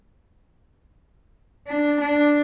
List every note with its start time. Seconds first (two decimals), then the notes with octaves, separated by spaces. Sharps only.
1.67 D4
2.01 D4